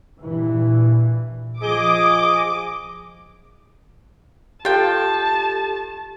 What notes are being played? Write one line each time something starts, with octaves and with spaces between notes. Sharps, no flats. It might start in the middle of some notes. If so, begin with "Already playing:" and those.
G2 A#2 E3
F3 G#4 D#5 D6
F4 G4 A4 G5 A5